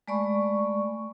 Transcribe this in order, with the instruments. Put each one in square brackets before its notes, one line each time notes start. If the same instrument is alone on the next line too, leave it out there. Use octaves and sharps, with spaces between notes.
[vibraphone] G#3 A3 D5 B5 C#6